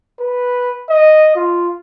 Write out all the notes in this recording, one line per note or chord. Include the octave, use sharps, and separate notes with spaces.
B4
D#5
F4